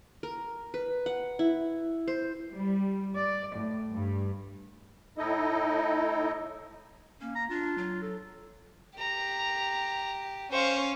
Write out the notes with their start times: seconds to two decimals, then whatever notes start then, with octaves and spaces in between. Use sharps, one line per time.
0.23 A#4
0.74 B4
1.06 F#5
1.39 E4
2.08 C5
2.52 G3
3.16 D5
3.55 A2
3.91 G2
5.18 A2 D#4 E4 A4 D#5
7.21 A#3 C#4
7.35 A#5
7.50 D4 F4
7.78 F#3
8.02 A4
8.99 G4 A#5
10.52 C#4 C5 F5 C#6